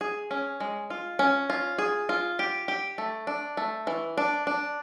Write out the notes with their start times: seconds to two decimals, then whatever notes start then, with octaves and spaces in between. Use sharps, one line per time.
0.01 G#4
0.31 C#4
0.60 G#3
0.90 F4
1.19 C#4
1.50 F4
1.78 G#4
2.09 F4
2.39 G4
2.68 G4
2.98 A3
3.27 D4
3.57 A3
3.87 E3
4.18 D4
4.47 D4